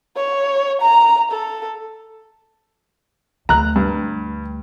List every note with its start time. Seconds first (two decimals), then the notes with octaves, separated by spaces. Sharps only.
0.16 C#5
0.81 A#5
1.31 A4
3.49 D2 A#5 F#6
3.76 G2